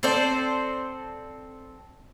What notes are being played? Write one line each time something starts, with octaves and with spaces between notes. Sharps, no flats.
C4 A4 C5 D5